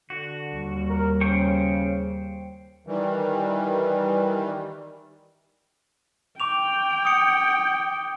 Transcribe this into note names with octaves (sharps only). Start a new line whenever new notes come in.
D3 F#4
D#2 G3
A#4
C#3 C5 G5 C#6
D#3 E3 G3
G5 C#6 D6 F7
D#6 C#7